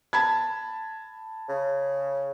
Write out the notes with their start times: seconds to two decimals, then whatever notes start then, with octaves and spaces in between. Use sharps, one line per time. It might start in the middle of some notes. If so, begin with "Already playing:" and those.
0.13 A5 B5 G#6
1.49 C#3